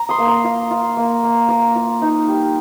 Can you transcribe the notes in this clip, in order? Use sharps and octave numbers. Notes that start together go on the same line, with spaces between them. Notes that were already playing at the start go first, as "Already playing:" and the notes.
Already playing: A#5
C6 D#6
A#3
A#5 D6
F4
F4
A#3
A#3
F4 A#5 D6
F4
D#4
G3